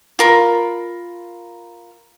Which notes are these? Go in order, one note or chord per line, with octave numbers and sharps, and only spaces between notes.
F4 A#4 B5